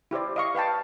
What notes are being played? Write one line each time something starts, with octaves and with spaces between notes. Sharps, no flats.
E4 G4 C5 D5
D#5 F5 C#6
B4 F5 G5 A5